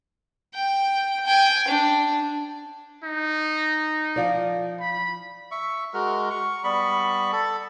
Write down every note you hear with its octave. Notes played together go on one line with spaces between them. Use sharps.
G5
G5 G#5
D4
D#4
F3 F4 D5
B5
E5 C#6
G#3 F#4 A#4
C#6
G3 B3 B5 C#6
A4 A5